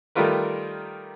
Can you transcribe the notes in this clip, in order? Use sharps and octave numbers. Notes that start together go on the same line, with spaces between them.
D#3 G3 A3 F4 A#4 B4